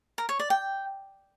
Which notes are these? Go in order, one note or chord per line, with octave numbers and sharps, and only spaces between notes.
A#4
C#5
D5
G5